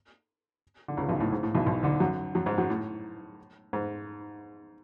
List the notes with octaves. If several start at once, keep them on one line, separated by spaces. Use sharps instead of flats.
D3
C#2 C#3
B1 B2
A2
G#2
A2
B1 B2
B1 B2
D2 D3
F#2 F#3
F#2 F#3
G#2 G#3
F#2 F#3
A2
G#2